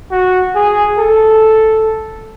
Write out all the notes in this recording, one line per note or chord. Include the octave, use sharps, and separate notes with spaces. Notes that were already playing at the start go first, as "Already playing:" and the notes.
F#4
G#4
A4